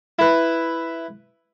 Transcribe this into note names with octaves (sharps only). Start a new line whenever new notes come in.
E4 B4